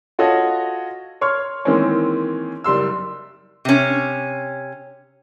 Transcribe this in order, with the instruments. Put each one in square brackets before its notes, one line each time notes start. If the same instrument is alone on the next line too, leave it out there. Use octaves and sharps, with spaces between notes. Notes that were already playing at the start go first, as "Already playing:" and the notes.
[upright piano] F4 F#4 A4 C#5 D#5
C#5 C6 C#6 F6
D#3 E3 G#3 A#3 C4 C#4
F#1 G3 C6 E6
[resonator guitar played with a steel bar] C3 C#4